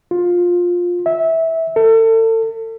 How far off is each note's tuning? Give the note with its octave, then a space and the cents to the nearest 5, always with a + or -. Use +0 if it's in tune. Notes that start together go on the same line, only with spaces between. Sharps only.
F4 +15
E5 -20
A4 +35